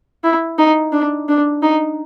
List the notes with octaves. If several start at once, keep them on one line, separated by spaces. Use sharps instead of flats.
E4
D#4
D4
D4
D#4